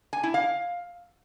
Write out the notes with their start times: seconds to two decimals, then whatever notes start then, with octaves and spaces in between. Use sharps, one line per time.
0.13 G#5
0.23 E4
0.34 F5